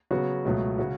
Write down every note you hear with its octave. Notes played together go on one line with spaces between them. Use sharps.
C#3 F#3 B3 F#4
C#2 B2 F#3 A3
C#3 G#3 C#4 F#4